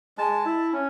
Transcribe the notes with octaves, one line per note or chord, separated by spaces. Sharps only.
G#3 A5
E4
C#4